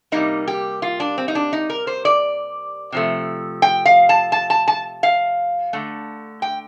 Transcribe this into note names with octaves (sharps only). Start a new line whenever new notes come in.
C3 G3 A#3 D#4
G4
F4
D4
C4
D#4
D4
D#4
A#4
C5
D5
C3 F3 A3
G5
F5
A5
A5
A5
A5
F5
D3 A3
G5